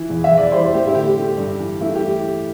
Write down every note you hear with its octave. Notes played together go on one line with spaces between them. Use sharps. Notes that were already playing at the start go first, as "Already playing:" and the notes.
Already playing: E3
E2
E5
E2
D5
G3 C5
A2 G4
E4
D3 G4
A3
G2
E3
A3 E4
G4